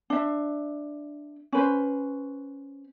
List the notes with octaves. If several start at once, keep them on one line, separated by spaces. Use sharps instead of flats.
D4 E5
C#4 B4 C5